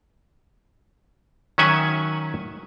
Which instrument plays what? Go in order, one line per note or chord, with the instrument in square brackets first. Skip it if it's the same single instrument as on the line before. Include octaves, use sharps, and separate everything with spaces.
[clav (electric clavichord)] D#3 F#3 C#4 E5 F#5 G#5